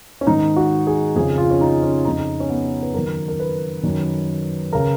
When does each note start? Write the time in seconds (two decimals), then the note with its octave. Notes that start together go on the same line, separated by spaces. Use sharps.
0.21 C#4
0.27 G#2 D#3 D#4
0.56 F#4
0.87 G#4
1.16 F2 C#3 G#4
1.38 F4
1.51 C#4
1.61 D#4
1.83 C#4
2.05 F2 C#3 D#4
2.40 C#4
2.50 B3
2.82 B4
2.94 F#2 D#3 A#4
3.28 A#4
3.40 B4
3.83 F#2 D#3
4.73 C#3 A#4